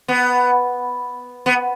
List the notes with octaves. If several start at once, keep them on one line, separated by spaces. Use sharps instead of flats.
B3
B3